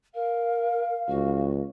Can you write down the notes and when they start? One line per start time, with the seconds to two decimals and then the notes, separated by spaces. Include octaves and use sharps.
0.15 A#4 F5
1.09 C#2 F#4